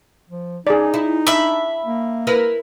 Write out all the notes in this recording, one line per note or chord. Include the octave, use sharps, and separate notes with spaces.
F3
D#4 G#4 D5
E4
D4 E5 B5
A#3
E4 A#4 B4